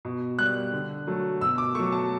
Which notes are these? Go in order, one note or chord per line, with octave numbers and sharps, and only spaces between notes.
B2
G3 F#6
D3
F#3 A3
B2 E6
D6
F#3 A3 C#6
A5